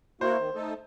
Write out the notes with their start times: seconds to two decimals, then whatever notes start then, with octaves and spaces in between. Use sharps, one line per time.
0.21 A#3 E4 F#4 C5
0.39 D#3
0.55 A3 D#4 A4